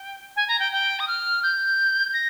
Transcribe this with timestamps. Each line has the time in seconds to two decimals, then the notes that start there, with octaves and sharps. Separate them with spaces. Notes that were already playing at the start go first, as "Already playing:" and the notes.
Already playing: G5
0.36 G#5
0.48 A#5
0.60 G5
0.72 G5
1.00 D#6
1.08 F6
1.43 G6
2.13 A#6